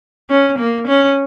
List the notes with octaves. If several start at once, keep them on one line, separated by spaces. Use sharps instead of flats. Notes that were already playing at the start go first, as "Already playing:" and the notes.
C#4
A#3
C#4